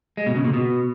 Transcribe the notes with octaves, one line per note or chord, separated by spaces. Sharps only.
G#3
B2
C#3
A#2
B2